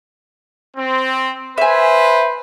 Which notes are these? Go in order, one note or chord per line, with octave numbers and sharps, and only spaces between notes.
C4
B4 C5 E5 G#5